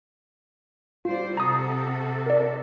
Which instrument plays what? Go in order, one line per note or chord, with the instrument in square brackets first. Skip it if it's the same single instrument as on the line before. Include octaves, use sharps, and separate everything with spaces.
[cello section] G3 C5 D5 [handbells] F4
[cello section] C3 F#4 A4 [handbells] A#5 D#6
[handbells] A#4 D5